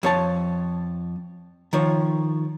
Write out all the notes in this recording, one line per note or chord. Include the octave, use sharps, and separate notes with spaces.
F2 C#5 A5
D#3 F3 C#5